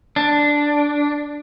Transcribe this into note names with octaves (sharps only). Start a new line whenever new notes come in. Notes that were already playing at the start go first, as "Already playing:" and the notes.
D4